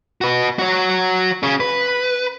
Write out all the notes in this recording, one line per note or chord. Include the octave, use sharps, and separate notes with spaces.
F#4 B4
F#4 C#5
C#4 G#4
B4